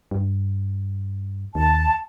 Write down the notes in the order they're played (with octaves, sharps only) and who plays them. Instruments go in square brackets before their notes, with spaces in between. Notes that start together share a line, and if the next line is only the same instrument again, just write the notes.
[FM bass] G2
[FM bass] D#2 [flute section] A5